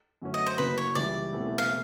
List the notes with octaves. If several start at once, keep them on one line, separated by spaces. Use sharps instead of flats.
F#2 D3 F#3 A3 C#4
D#5
C5
F#1 F#2 C#3 F#3 A#3 B4
C#5
C#2 C#3 E3 G3 D5
E1 E2 C3 E3 A3
F5